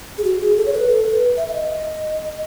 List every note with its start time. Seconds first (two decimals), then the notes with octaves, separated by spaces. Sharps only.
0.18 G#4
0.24 F#4
0.40 G#4
0.57 A4
0.66 C#5
0.73 B4
0.88 A4
1.05 B4
1.37 E5
1.48 E5
1.53 D#5